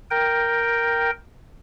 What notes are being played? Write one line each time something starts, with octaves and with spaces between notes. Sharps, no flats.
A#4 G5